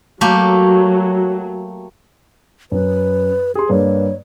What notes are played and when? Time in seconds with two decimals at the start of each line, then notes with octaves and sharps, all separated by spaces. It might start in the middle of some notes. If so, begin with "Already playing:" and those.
0.21 F#3 A3 A#3 G4
2.72 F#2 B4
3.55 G4 G#4 C6
3.69 G2 A#3 B4 C#5